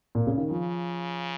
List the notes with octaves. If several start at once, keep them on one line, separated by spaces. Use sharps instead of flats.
A#2
C#3
D#3
C#3 F3